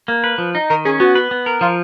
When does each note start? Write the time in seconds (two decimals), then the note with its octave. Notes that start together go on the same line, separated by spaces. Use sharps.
0.08 A#3
0.24 B4
0.38 F3
0.55 D#4
0.70 D#3 A#4
0.85 C#4 G#4
1.00 B3 F#4
1.15 B4
1.31 B3
1.46 A#4
1.61 F3 F4